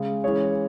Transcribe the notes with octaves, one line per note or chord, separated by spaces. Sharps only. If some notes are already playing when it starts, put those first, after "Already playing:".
Already playing: C#3 G#3
E3 G#3 C#4 G#4 C#5